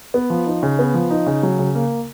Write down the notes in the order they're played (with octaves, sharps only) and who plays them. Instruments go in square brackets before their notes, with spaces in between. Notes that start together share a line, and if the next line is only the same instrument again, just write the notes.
[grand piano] B3
F3
D#4
C#3
B3
F3
D#4
C#3
F#3
C#3
A#3